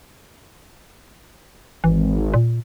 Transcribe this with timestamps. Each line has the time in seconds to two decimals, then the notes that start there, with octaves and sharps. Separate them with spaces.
1.84 G#1 E3
2.34 A#2